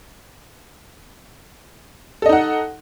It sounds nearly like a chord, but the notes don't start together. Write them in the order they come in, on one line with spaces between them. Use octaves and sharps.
A4 D#5 D#4 F#5